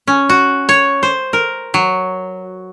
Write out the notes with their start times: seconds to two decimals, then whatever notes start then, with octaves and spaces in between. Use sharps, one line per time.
0.07 C#4
0.29 F#4
0.69 C#5
1.03 C5
1.33 A#4
1.74 F#3